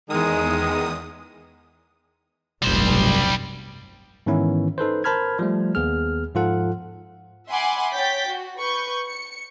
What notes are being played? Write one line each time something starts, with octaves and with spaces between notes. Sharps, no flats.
E2 D#3 G#3 D#6
F1 B1 G2 G3 C5
G#2 D#3 E3 B3 C#4 E4
D#4 A4 B4 C5
A#4 C5 A5 B5 F6 G#6
F3 G3 A3
D#2 B3 G#4 F6
G#2 F3 F4 A4 F#5
E5 F#5 G#5 B5 C6 D6
C#5 G5 G6 A6 B6
F#4
B4 C#6 G6
C#7